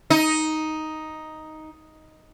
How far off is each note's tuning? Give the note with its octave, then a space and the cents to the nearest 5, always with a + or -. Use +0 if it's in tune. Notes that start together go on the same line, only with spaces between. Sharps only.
D#4 +5